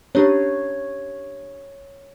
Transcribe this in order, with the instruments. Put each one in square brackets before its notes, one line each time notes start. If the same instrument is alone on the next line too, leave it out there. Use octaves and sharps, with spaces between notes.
[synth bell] C#4 D4 G4 [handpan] C#5